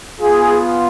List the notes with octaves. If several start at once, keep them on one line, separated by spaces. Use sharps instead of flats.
B3 F4 G#4